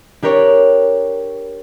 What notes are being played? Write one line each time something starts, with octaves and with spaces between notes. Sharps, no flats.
D4 G4 A#4 C#5